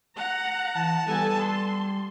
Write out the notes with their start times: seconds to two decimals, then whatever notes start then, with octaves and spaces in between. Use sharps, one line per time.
0.16 F#5 A#5
0.75 E3 A5
1.06 G3 B3 A4 G#5
1.41 C6